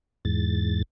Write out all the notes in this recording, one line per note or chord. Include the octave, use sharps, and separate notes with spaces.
E2 G#2 A6